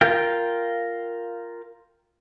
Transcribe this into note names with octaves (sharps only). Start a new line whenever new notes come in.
F4 A#4 G5